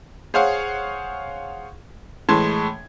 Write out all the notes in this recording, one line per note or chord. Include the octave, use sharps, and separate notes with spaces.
G#4 C5 C#5 F5 F#5
A2 E3 G#3 A5 C6 G#6